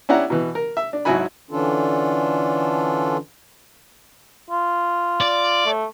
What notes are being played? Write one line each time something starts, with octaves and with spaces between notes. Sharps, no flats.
C#4 D4 E4 G4 F#5 A#5
B2 E3
A#4
E5
D4
G#1 F#3 E4 F#4 G#5 B5
D3 E3 C#4 D4 F4 A4
F4
D5
A3